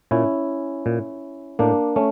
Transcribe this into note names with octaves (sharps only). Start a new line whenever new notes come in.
A#2 C#4 E4
A#2
A2 A#3 D4
A3 C#4